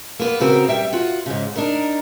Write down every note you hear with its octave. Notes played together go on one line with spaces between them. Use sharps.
A#3 B3 B4
C#3 C4 F#4 A#4
G3 E5 G5
F4 F#4 F#5
G#2 C#3
D4 D#4 A#4